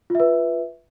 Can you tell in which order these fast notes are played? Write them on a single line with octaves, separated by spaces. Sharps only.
F4 E5 B4